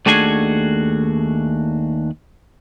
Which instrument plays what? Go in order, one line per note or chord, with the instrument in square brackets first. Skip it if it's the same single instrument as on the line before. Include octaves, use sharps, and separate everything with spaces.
[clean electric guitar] D#2 A3 D4 F#4 G#4 G#5